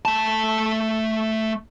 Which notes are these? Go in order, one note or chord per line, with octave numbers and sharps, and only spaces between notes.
A3 A5